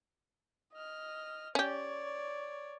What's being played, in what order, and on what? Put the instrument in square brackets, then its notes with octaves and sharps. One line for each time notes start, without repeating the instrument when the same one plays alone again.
[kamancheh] D#5 F6
[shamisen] C#4 G4 [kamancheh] C#5 D5